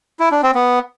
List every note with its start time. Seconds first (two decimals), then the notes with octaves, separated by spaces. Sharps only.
0.19 E4
0.31 D4
0.43 C4
0.55 B3